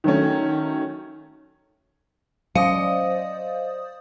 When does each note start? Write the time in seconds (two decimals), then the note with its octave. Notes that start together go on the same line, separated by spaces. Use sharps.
0.04 D#3 F#3 A3 C#4
2.55 F#3 C#4 C5 D5 D#5 F5 D#6